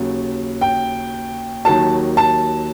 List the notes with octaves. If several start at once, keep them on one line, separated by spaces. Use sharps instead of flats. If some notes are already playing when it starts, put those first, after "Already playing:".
Already playing: D#2 C#3 F#3
G5
D#2 D#3 F#3 A5
A5